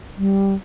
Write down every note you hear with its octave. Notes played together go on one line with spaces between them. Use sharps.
G3